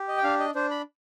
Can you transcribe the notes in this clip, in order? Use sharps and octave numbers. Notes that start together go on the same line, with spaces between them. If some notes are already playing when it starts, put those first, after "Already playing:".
Already playing: G4
D#5
G5
D4 F5
D#5
D4 C5
B5